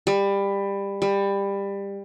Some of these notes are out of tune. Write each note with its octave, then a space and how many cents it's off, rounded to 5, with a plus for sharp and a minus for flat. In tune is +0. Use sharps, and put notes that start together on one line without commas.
G3 +20
G3 +20